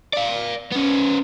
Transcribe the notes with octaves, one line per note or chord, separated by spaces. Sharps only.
D5 F5
B3 C#4